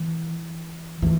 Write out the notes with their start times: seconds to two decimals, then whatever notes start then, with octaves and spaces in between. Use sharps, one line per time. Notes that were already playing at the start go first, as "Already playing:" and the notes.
Already playing: E3
1.02 E3